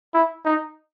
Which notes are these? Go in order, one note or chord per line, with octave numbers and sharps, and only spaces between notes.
E4
D#4